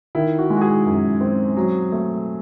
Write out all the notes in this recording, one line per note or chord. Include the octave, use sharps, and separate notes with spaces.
D#3 E4
F#4
G#3
F#4
G#4
F#2
C4
F#3
A3